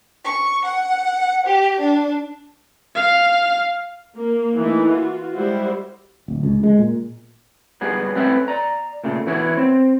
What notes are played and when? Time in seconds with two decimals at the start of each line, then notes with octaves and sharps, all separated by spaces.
0.23 C#6
0.63 F#5
1.45 G4
1.78 D4
2.95 F5
4.16 A#3
4.58 E3 A3 D#4
4.89 F4 F#4
5.32 G3 G#3 E4 F#4 C5
6.28 D1
6.43 C#2
6.63 G#3
6.78 A#2
7.81 F#3 G3 B3 G#4
8.15 A3 C4 C#4 B4 E5
8.48 D5 A#5
9.04 A#2 C#3 A3
9.27 E3 B3 E4 F#4 C#5
9.57 C4